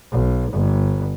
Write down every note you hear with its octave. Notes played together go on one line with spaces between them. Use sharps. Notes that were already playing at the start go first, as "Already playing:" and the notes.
B1
G1